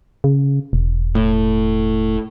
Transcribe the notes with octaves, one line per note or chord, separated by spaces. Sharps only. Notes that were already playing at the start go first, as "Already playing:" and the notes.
C#3
E1
A2